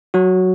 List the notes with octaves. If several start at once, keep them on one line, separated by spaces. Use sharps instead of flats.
F#3 F#4